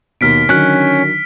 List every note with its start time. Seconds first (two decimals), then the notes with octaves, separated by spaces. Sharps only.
0.21 D#2 B2 F6 B6 D7
0.49 D3 D#3 F#3 C#4 F#6